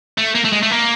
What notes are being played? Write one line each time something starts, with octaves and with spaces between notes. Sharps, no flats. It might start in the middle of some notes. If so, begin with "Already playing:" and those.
A3
A#3
A3
G#3
A3
A#3